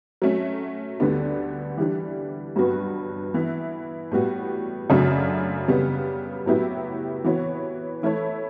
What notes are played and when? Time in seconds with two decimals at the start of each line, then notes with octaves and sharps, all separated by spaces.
0.22 F#3 A3 C#4
1.00 D2 D3 G3 B3 D4
1.78 E3 G3 D4
2.56 G2 F#3 B3 F#4 B4
3.34 E3 B3 E4
4.11 A2 G3 B3 F#4
4.90 F#2 C#3 F#3 A3 D4
5.68 C#3 G3 B3
6.46 A2 F#3 B3 E4 G4
7.24 E3 B3 F#4 C#5
8.03 E3 A3 E4 A4 C#5